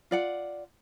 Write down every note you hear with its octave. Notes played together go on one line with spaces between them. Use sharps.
F4 D5 F#5